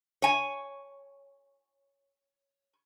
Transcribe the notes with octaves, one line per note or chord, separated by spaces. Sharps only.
C#5 G#5